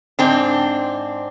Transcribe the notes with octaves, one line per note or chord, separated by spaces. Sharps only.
G#2 C4 D4